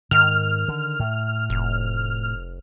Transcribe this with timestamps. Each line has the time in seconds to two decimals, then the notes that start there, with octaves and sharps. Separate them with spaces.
0.11 G#2 D#3 F6
0.68 D3
1.00 A2
1.50 F1